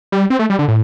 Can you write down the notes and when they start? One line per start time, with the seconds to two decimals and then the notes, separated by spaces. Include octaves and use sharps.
0.12 G3
0.30 C4
0.39 A3
0.50 G3
0.59 D3
0.68 A2